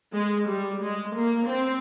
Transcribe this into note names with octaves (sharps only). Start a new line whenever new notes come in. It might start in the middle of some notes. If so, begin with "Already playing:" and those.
G#3
G3
G#3
A#3
C4